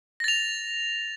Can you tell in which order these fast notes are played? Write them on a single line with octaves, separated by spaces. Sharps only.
A#6 A6 F7